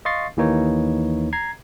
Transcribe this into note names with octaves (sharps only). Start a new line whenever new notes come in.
D#5 F5 C6 C#6 A6 C7
D#2 E3 A#3 D#4 C#5
A#5 G#6 C7